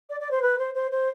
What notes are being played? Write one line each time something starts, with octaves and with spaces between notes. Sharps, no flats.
D5
D5
C5
B4
C5
C5
C5